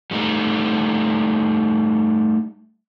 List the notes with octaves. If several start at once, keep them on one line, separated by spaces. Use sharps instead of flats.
G3 A3 D#4